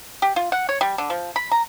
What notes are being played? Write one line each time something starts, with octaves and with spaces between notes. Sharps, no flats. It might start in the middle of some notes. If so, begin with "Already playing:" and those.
G4
F4
F#5
C#5
G3
D3
F3
B5
A#5